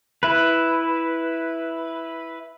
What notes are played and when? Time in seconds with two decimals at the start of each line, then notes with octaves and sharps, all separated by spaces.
0.23 E4 B4